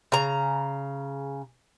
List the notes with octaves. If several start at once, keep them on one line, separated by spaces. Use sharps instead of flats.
C#3 A#5